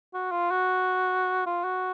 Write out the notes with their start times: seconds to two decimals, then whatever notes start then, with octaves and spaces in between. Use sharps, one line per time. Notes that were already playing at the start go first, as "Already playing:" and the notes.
0.14 F#4
0.32 F4
0.51 F#4
1.46 F4
1.64 F#4